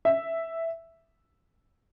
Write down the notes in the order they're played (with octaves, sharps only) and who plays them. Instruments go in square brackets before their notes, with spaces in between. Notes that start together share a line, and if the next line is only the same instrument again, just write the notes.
[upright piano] E5